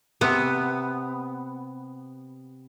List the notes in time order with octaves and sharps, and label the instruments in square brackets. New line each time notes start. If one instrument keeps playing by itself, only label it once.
[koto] C3 B3